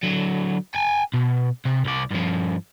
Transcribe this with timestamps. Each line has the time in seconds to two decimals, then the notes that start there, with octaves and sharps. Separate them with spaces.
0.03 D3 F#3
0.75 G5 G#5
1.14 B2
1.65 C3
1.85 C2 D5
2.11 G2 F3